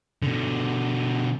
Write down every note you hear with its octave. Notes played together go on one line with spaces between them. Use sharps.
B2 D3